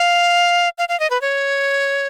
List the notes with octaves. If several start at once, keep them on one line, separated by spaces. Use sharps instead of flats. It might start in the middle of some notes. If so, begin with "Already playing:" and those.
Already playing: F5
F5
F5
D#5
B4
C#5